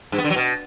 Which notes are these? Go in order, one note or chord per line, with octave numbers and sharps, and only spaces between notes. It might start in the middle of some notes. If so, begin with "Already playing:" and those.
G2
B3
D3
F#3
B2